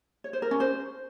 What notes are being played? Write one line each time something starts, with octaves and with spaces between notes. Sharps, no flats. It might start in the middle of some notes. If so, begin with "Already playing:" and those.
C#5
C5
A#4
C#4
C5